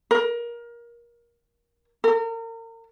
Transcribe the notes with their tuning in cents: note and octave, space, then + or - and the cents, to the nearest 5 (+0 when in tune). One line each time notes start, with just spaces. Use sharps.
A#4 +20
A#4 -35